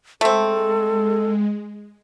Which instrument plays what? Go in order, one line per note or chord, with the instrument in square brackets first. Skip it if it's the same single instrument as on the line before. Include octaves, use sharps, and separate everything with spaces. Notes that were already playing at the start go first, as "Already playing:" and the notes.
[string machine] G#3 [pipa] A3 C4 [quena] A4